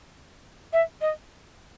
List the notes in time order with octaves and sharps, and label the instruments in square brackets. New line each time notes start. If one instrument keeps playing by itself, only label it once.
[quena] E5
D#5